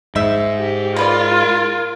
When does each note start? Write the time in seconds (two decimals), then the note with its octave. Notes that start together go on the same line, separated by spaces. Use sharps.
0.16 G#2 D#4 E5
0.58 G4
0.96 A#3 F4 A#4 B4 D5